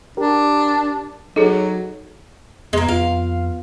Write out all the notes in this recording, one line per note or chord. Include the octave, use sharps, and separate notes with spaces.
D4 G4 A#4
F#3 D#4 G#4 A4 C#5
F2 G#3 A#3 B3
F2 F4 F5